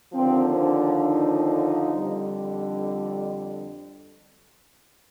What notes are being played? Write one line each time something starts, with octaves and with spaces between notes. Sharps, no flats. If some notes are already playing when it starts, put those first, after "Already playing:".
D#2 D3 F3 C4
D4
D#4
F2 D3 G3